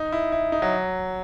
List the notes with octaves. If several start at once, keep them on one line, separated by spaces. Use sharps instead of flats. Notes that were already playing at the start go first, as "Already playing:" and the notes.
Already playing: D#4
E4
E4
D#4
F#3